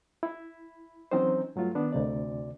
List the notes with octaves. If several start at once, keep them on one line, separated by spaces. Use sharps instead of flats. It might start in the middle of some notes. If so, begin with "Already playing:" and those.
E4
E3 F#3 C4 C#4 D#4 C5
G2 F#3 A3 F4
D#3 B3 D4
D2 C3 D5